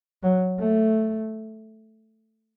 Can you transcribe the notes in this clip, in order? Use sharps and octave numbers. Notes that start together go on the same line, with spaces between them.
F#3
A3